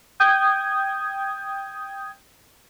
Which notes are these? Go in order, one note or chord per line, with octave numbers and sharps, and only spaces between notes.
G5 D#6 G6 G#6